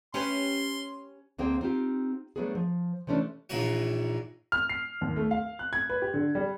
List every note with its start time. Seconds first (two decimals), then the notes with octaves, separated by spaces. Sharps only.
0.14 C#4 G4 B4 C6
1.38 D2 A#3 C4 G#4 C5 G5
1.61 C4 D#4 F4 G4
2.36 F#3 A3 B3 D4 G#4
2.55 F3
3.07 C3 E3 A3 C#4 D4
3.50 A#1 A#2 D#3 E3 C#5 F#5
4.52 F6
4.69 C7
5.01 D#2
5.16 A3
5.31 F5
5.59 F#6
5.73 G#6
5.90 B4
6.02 G4
6.14 D3
6.35 G3